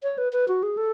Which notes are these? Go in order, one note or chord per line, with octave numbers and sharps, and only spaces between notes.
C#5
B4
B4
F#4
G#4
A4